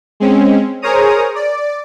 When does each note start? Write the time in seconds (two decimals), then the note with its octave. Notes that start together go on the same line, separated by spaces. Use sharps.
0.20 G#3 C4 C#4
0.82 G#4 A#4 C5 C#5 A#5 D#6
1.35 D5